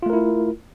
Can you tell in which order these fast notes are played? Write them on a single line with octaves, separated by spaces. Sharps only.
F4 A3 A#4 E4